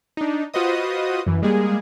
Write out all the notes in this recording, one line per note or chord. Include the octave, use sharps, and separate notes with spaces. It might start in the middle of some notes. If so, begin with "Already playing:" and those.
D4 D#4
F4 F#4 B4 C5 D#5 D#6
F#2 E3
G3 G#3 A#3 G#4